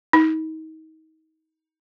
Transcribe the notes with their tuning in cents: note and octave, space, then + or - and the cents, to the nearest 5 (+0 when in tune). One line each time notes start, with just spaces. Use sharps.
D#4 +30